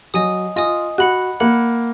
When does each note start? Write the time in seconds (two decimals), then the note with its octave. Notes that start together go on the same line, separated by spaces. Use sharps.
0.14 F#3 D#5 G#5 D#6
0.56 F4 D#5 G#5 D#6
0.98 F#4 F#5 B5 F#6
1.40 A#3 F#5 B5 F#6